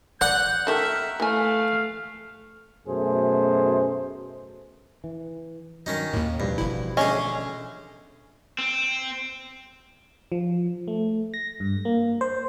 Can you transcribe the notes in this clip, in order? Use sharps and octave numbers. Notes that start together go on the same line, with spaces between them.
D5 F#5 G6
D#3 A3 G4 A#4 E5
E3 A3 F5 G#5
F#2 B2 A3 G#4 C5
E3
G2 D#3 F#3 C#4 D#4
D#2 A2 A#3
G2 B2 E3 F3
G1 E4
D3 A3 C#4 G#4 D#5
C4
F3
A3
A#6
G2
A#3
C5